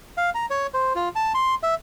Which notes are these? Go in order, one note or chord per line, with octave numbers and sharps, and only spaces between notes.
F5
A#5
C#5
C5
F4
A5
C6
E5